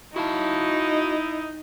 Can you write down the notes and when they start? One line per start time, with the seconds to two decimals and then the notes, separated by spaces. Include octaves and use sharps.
0.16 D#4 E4 F#4 F5 A5